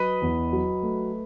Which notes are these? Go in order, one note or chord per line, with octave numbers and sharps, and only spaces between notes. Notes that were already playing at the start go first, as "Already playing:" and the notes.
Already playing: F#3 B4 D#5
E2
F#3
A3